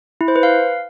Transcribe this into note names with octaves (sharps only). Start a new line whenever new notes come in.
E4
C5
B4
F5